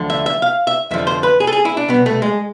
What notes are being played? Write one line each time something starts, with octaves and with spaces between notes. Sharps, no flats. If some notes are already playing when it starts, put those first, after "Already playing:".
Already playing: D2 D3 F3
E5
E5
F5
E5
F2 D3 F3 E5
C5
B4
G#4
A4
G#4
E4
D4
C2 B2 B3
A3
G#3